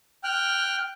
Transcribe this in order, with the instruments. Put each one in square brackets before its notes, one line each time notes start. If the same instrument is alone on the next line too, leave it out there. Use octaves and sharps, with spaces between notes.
[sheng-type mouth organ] G5 F6 F#6